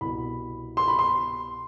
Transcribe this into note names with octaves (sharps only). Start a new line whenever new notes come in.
C2 B2 B5
C6
B5
C6